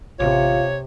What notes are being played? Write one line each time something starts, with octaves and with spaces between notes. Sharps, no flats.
A1 C3 F4 C#5